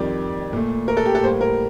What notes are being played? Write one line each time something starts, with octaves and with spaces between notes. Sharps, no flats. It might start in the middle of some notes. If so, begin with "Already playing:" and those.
Already playing: F2 D#3 G3 D5
A#2 A3
A#4
A4
G4
A4
A2 G3 A#3 C5
A#4